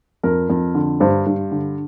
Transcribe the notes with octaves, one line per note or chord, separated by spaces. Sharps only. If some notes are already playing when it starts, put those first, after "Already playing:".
F2 A#4
F2
D3
G2 C5
G2
D3